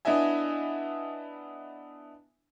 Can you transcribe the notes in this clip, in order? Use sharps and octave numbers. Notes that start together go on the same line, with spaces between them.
B3 D4 E4 D#5 E5 G#5